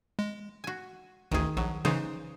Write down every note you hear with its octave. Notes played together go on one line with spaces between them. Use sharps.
G#3
F#4 G#5
A1 D2 D#3 G#4
A#1 F#3
C#3 E3 C#4 D#4 C5